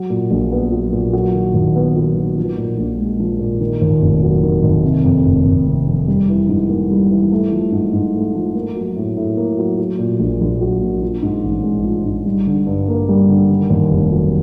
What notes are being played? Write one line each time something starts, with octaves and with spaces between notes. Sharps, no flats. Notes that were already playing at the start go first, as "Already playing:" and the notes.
Already playing: F#3
A#2
A#1
B3
F#3
A#2
F#3
D#3
D#2
B3
F#3
D#3
F3
A#2
A#1
G#3
F3
A#2
D#3
D#2
F1
F#3
D#3
D#2
C3
F2
F1
F1
C3
F2
G3
E3
G#2
A#3
G3
E3
A3
F3
G#2
G#2
A3
F3
A#3
F#3
A2
A2
A#3
F#3
F#3
A#2
A#1
A#1
F#3
A#2
F3
G#2
A1
G#3
F3
G#2
G3
D3
G2
A#3
G3
D3
D#3
D#2
F1
F#3